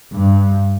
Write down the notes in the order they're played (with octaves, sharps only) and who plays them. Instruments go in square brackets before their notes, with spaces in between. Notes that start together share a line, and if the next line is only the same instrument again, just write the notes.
[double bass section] G2